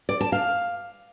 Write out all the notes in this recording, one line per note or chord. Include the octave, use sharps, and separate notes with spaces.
D5
A5
F5